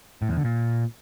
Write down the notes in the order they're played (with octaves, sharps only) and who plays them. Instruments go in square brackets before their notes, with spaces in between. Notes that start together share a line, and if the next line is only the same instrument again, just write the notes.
[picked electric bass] A2
E2
D3
A#2